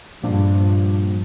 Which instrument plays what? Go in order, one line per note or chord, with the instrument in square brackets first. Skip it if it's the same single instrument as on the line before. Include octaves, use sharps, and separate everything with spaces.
[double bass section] G2 [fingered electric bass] A#2 F3 A#3 D4